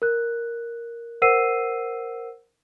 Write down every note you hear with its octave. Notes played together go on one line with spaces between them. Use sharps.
A#4 F#6
A#4 C5 F#5 E6 C7 D#7